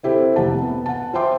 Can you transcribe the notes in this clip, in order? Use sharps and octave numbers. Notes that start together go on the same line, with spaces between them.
C4 E4 G4 A4 C5
F1 G4 F#5 A5
B3
F#5 A5
F4 C5 E5 G5 C6 D6